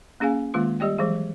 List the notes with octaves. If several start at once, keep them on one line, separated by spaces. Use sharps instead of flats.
A#3 C#4 G#4 F5 G#5
D#3 G#3 A#3 F4 C6
G3 G4 D5 G5
E3 F#3 G#3 G#4